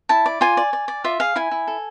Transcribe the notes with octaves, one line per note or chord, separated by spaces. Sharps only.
E4 A5
D5
F4 G#5
D5
D5
D5
F4 E5
G#4 F5
E4 G#5
E4
A4